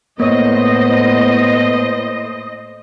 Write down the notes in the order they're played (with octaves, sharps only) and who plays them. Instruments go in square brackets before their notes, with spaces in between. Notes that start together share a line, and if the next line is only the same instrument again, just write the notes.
[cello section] A2 C5 [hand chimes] A#3 C#5 [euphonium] B3 [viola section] D#5